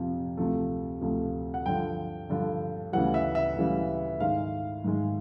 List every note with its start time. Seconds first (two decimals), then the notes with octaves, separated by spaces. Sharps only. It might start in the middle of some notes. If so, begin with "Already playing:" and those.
Already playing: F2 C3 F3
0.37 D2 C3 F3 A3
1.01 D2 C3 F3 A3
1.54 F#5
1.66 G2 D3 F3 G5
2.30 G2 D3 F3
2.93 D2 C#3 E3 G3 F#5
3.14 E5
3.35 E5
3.56 D2 C#3 E3 G3
4.20 G#2 D#3 G#3 F5
4.84 G#2 D#3 G#3